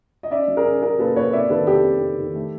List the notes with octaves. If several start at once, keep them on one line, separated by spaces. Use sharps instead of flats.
D#5
C#4 D5 E5
F#3
G#4 A#4
C#4
C#4 G#4 A#4
A#3 A4 B4
A#3 B4 C#5
C4 D5 E5
D#3 A4 B4
C4 G4 A4
C4
C4
D#3
A3